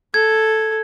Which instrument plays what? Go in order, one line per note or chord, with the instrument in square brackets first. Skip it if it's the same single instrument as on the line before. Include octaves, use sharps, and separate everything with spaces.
[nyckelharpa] A4 [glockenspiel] G#6